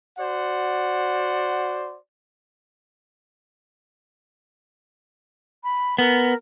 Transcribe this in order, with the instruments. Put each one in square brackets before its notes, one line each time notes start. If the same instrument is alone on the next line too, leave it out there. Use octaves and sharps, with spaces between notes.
[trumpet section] F#4 C5 D5 F#5
[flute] B5
[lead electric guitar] B3 [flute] A#4